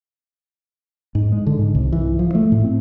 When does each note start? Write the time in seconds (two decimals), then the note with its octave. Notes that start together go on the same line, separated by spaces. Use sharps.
1.15 G#2
1.32 G#3
1.47 D3
1.59 G#2
1.75 C2
1.92 E3
2.19 F3
2.35 A3
2.52 A2
2.64 C4